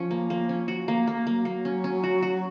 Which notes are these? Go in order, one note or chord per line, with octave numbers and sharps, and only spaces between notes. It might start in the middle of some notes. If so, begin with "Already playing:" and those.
Already playing: F3 C#4
A#3
A#3
C#4
F#4
A#3
A#3
F#3 A#3
A#3
C#4
C#4
F#4
F#4